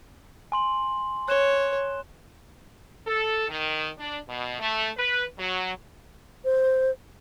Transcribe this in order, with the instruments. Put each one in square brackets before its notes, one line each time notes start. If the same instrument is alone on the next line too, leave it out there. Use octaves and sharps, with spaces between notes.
[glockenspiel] G#5 C6 F#7
[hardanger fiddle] C#5 [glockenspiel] F#6 E7 G7
[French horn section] A4
D#3
D4
B2
A3
B4
F#3
[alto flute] C5